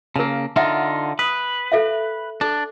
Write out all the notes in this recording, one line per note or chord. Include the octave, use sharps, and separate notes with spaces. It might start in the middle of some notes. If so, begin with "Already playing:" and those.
C#3 A#3 A#4 A5
D3 D#4 F4 E5 F#5
B4 D#6
A4 E5 F5
D4 A4